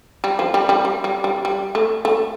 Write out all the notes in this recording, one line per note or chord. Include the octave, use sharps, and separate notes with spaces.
G3
F3
G3
G3
G3
G3
G3
G3
A3
A3